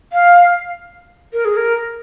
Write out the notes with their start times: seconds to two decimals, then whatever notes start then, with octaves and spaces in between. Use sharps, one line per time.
0.13 F5
1.33 A#4
1.45 G#4
1.57 A#4